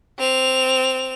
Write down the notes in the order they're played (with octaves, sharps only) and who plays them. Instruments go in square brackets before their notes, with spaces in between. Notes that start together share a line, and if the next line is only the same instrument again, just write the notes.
[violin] C4 F7